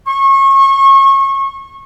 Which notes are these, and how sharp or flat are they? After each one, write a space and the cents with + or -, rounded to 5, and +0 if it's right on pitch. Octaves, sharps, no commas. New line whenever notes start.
C#6 -30